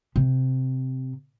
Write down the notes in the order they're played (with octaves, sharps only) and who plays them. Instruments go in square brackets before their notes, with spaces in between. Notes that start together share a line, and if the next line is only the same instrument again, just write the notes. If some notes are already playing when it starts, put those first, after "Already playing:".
[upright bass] C3